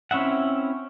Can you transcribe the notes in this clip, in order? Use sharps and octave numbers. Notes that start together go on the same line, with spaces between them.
C4 C#4 E4 E5 F#5